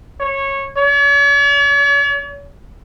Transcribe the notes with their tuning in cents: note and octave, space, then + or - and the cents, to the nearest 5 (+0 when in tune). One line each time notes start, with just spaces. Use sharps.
C#5 -15
C#5 +45